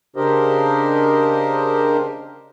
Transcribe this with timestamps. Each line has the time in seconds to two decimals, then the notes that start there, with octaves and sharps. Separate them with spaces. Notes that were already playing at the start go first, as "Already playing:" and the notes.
0.16 C#3 D4 G4 A#4 C5 D#5